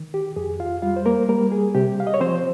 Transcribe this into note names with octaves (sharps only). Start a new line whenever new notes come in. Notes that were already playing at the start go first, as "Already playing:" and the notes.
Already playing: D#3
G4
F2 G#4
F4 F5
G3 F4 F5
C5
A#3 A#4
G3 A#3 A#4
G#4
C3 G4
F5
D#5
C#5
F3 C4 C5